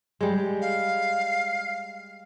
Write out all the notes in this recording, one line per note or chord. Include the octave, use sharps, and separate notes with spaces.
G3 G#3
F5